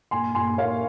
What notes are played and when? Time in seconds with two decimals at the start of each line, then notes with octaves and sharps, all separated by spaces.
0.11 A#2 G#5 C6
0.35 A#2 G#5 C6
0.58 A#3 C#5 F5